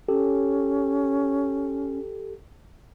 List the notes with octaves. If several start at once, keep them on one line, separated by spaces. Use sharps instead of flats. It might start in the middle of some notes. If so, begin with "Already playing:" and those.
C#4 G4 A4